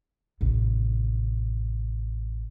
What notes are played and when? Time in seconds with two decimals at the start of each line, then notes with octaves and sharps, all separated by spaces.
0.41 A1 C3